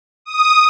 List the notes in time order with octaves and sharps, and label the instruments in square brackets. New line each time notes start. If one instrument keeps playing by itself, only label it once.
[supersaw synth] D#6